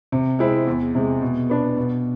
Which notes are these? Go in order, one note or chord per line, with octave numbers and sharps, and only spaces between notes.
C3
G#3 C4 E4
E2
C3 G#3
B2
B3 D4
B2